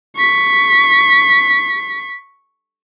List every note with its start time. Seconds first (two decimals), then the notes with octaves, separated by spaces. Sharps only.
0.16 C#6 B6